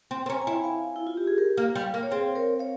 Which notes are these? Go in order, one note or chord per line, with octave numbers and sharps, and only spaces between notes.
C4
C4
C#4 A#5
G#5
E4
G5
F5 G#5
E4
F4
G4
G#4
G4 A#4
A#3
G3
A#3
C#5
C4 G#4 C5
A#4 C#5
C#5 F5